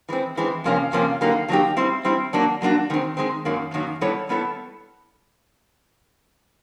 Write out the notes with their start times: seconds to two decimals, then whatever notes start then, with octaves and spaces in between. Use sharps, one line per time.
0.09 E3 G#3 C4
0.37 E3 G#3 C4
0.64 F2 C3 F3 A#3 C#4
0.93 F2 C3 F3 A#3 C#4
1.21 D3 F#3 A#3 D#4 G4
1.48 D3 F#3 A#3 D#4 G4
1.77 G3 C4 E4
2.05 G3 C4 E4
2.33 F#3 A#3 D4 F#4
2.62 F#3 A#3 D4 F#4
2.90 D#3 G#3 C4
3.17 D#3 G#3 C4
3.45 F#2 D#3 F#3 A#3
3.74 F#2 D#3 F#3 A#3
4.01 G3 B3 E4 A4 C#5
4.29 G3 B3 E4 A4 C#5